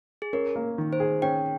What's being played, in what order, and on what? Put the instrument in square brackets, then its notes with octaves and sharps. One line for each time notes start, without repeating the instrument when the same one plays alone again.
[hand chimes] G#4
[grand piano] C#4 [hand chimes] A#4
[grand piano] A#3
D#3
[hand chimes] C5
[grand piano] G#4
[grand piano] C#4 [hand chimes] G5